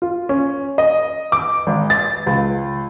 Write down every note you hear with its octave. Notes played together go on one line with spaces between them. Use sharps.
F4
C#4
D#5
D6
G#1
A6
C#2